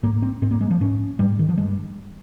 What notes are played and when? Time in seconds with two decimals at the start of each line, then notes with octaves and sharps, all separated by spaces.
0.03 G#2 A#3
0.22 C4
0.42 G#2 C4
0.51 A#3
0.61 G#3
0.70 F3
0.81 G#2 C#4
1.19 G#2 G3
1.39 D#3
1.49 F3
1.57 G2 G#3